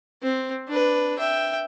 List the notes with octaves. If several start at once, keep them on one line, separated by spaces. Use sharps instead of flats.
C4
D4 B4
E5 G5